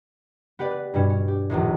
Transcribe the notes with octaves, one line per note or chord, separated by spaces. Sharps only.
B3 G4 B4 D5
B4
G2 B2 G3 C#4 E4
C#4
G4
D#1 A#1 E2 A2